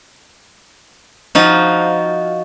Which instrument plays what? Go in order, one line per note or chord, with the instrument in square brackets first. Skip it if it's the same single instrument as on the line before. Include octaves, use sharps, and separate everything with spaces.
[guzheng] F3 D#4 F#4